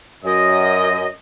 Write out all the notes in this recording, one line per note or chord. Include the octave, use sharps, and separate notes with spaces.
F#2 D#5